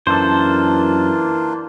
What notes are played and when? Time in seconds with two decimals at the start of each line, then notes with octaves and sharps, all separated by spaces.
0.07 F#2 E3 A#3 D4 F4 A4 C5